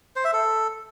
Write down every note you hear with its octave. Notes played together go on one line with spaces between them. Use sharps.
C5
E5
A4